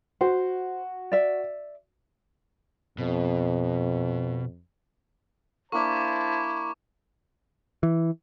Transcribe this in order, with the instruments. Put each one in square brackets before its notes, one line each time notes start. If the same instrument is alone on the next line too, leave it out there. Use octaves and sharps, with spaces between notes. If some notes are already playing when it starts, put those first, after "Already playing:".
[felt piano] F#4 [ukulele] C5
[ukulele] D5 E5
[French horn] F2 [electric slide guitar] B2
[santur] A#3 D4 [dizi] E4 [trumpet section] C5 A5 [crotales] C#6 D6
[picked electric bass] E3